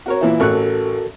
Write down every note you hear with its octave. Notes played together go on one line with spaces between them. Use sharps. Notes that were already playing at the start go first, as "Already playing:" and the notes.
F#4 A#4 C#5
A#2 E3 E4
A1 F#4 A4 A#4 C#6 F#6